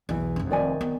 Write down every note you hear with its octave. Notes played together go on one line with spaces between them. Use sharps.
B1 E2 E3
F1 D4
D#3 D5 G#5
B3